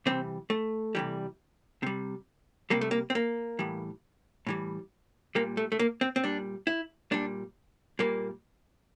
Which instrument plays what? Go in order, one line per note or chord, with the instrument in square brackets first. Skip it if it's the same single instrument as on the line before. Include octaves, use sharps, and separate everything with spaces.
[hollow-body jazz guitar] C3 E3 G3 C4
A3
C3 E3 G3
C3 G3
C3 G3 A#3
A3
A#3
C4
A#3
A2 E3 G3
A2 E3 G3
A#2 G3 A#3
A3
A3
A#3
C4
C4
A#2 G3 D4
E4
A#2 G3 D4
A#2 G3 A#3